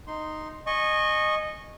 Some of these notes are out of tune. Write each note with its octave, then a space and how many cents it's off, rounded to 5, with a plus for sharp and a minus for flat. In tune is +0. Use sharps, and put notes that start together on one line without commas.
D#4 -5 C6 +0
D#5 -15 G#5 +10 C#6 -20